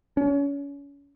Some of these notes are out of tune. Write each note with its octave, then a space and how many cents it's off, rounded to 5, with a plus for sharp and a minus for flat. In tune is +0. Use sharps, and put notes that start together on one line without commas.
C#4 +35